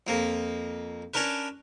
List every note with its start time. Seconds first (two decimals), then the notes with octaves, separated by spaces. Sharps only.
0.07 F2 A#3
1.14 C#4 D4 A#4 B4